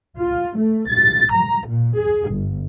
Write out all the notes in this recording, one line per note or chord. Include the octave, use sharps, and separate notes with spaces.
F4
A3
A6
A#5
A#2
G#4
G1